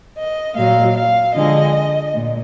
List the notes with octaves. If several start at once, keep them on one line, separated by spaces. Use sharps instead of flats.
D#5
A#2 F#3 F5
F5
D3 F3 G#3 D#5
A#2